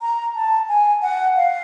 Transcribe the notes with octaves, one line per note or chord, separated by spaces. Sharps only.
A#5
A5
G#5
F#5
F5